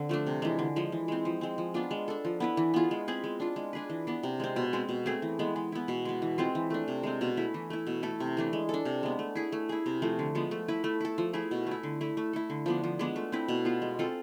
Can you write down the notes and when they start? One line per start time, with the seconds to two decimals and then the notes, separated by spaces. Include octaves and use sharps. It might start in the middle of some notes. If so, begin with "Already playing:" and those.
Already playing: D3 C4
0.09 F3 A3 D4
0.27 C3
0.42 E3 G#3
0.59 D3
0.76 F3 G#3
0.92 E3
1.08 G#3 C4
1.25 F3
1.41 G#3 C4
1.58 F3
1.74 B3 D4 F4
1.91 G#3
2.08 D4 A4
2.25 F3
2.40 B3 E4 B4
2.57 E3
2.74 B3 F4 G#4
2.91 G#3
3.08 C4 G#4 B4
3.24 G#3
3.40 D4 F4
3.56 G#3
3.73 D4 G#4 B4
3.90 E3
4.07 B3 D4
4.23 C3
4.40 G#3 C4
4.56 B2
4.73 G#3 C4
4.89 B2
5.06 A3 C4 G#4
5.22 E3
5.39 G#3 B3
5.56 G#3
5.72 B3 E4
5.88 B2
6.05 G#3 B3
6.22 E3
6.38 G#3 C4 F4
6.55 E3
6.70 A3 D4
6.88 C3
7.03 G#3 C4
7.21 B2
7.37 A3 E4 B4
7.54 E3
7.70 A3 E4
7.87 B2
8.03 A3 E4 A4
8.20 C3
8.37 E3 A3 D4
8.53 G#3
8.69 D4 A4
8.85 C3
9.03 G#3 B3
9.19 A3
9.35 E4 G#4
9.52 A3
9.69 E4 G#4
9.86 C3
10.02 F3 A3
10.19 D3
10.35 F3 G#3 B3
10.51 A3
10.68 E4 B4
10.84 A3
11.01 E4 A4
11.18 F3
11.33 A3 E4 G#4
11.51 B2
11.67 A3 E4
11.83 D3
12.01 A3 E4
12.17 A3
12.33 E4 A4
12.50 D3
12.66 F3 B3 D4
12.84 F3
12.99 G#3 B3 D4
13.16 A3
13.32 C4 E4 B4
13.48 B2
13.65 B3 F4
13.82 G#3
13.99 C4 F4 A4